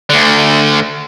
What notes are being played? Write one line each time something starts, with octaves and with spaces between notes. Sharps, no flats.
D2 D3